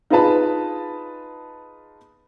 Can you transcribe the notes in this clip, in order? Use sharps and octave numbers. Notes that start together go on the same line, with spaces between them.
D#4 F4 G#4 B4 A5 B5